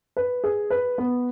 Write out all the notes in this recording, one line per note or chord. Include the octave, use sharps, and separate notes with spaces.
B4
G#4
B4
B3